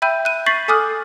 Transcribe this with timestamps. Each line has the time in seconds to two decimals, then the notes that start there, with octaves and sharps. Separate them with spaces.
0.02 E5 G5 B5 E6 G6 D#7
0.25 F#6 D#7
0.46 C#6 G6 A6 B6 C7 F#7
0.68 A4 G#5 D6 D#6 F6 F#6